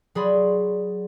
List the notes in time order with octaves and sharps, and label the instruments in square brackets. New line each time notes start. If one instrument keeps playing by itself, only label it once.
[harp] F#3 G#4 D5 B5 C6